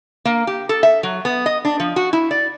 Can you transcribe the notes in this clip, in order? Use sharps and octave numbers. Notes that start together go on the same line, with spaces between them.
A#3
G4
A4
E5
F#3
B3
D#5
D4
F3
F#4
E4
D5